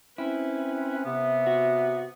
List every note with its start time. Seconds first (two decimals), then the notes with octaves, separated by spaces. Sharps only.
0.18 C4 C#4 E4 B4
1.05 C3 B3 E5
1.47 F#4